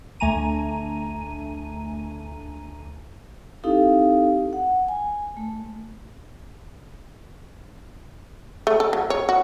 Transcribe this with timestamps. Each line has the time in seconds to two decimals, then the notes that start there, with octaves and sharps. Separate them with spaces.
0.20 D2 A3 G#5 A#5 D#7
3.64 C4 D#4 E4 G4 A4 F5
4.53 F#5
4.88 G#5
5.37 A3
8.67 A3
8.80 A4
8.93 F#3
9.10 C#5
9.29 F#4